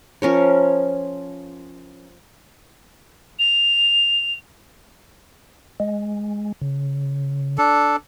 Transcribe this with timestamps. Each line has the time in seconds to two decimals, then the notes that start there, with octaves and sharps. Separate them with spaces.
0.22 F3 C#4 A#4 C#5
3.39 F7
5.80 G#3
6.61 C#3
7.58 D4 A4